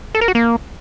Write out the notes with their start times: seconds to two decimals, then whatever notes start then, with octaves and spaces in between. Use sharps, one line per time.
0.15 A4
0.21 A#4
0.28 F#4
0.35 A#3